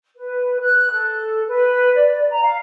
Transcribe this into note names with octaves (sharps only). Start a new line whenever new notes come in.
B4
F#6
A4
B4
D5
A#5
F5